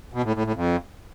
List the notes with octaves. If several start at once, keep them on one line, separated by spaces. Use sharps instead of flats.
B2
A2
A2
A2
F2